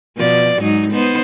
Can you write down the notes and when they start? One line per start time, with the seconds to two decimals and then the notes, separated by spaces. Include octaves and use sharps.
0.17 B2 F3 D5
0.60 G#2 F#3 D#4
0.91 B3 D#4 C5